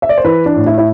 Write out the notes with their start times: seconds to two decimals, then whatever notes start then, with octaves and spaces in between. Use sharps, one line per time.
0.02 E5
0.09 D5
0.18 C5
0.25 E3 B4
0.46 D4
0.56 A2
0.66 E4
0.78 E4